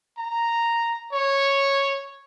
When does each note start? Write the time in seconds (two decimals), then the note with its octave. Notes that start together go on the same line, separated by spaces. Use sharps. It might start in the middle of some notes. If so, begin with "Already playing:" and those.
0.18 A#5
1.13 C#5